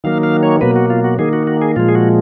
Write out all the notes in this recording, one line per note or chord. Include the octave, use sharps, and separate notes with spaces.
D#3 F#3 A#3 F5
F5
C#5
B2 F#3 A#3 B4
F#4
F4
F#4
D#3 A#3 G#4
F#4
F#4
G#4
A#2 F3 G#3 F4
G#4
F#4